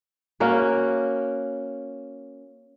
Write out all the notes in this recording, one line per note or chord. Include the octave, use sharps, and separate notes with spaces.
A#3 C#4 F#4